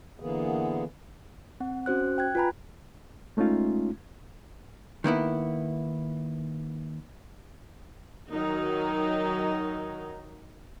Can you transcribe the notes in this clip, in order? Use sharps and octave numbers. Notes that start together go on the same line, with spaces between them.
D3 E3 A#3 B3 G#4
C4 F#5
C#4 F#4 C5 F#6
G5 F#6 G#6
F4 B4 G#5 A#5 B5
G#3 A3 C#4 D#4 F4
D#3 A#3 B3 E4
D#3 F#3 D#4